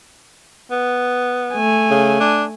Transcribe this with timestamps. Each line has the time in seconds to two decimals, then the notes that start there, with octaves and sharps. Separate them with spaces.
0.71 B3
1.54 A3 G#5
1.91 C#3
2.20 D4